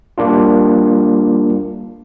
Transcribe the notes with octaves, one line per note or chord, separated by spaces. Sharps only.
G3 A#3 D4 F4